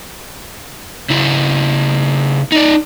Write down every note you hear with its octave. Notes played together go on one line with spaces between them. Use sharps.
C#3 E4
D#4 D5